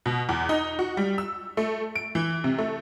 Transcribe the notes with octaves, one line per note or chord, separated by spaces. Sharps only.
B2
E2
D#4
F#4
G3
E6
A3
D7
E3
C3
A3